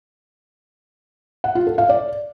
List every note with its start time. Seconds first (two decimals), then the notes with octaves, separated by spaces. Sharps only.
1.44 F#5
1.55 F4
1.67 A4
1.78 F5
1.89 D5